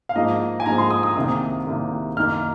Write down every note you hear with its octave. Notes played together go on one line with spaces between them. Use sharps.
F5
G#2 F3 A#3 D#4 D#5
G#5
G#2 F3 A#3 D#4 A#5
C6
D#6
D#6
C2 C3 D#3 A#3 D#6
C2 C3 D#3 A#3
F#2 D#3 A#3 D#4 F6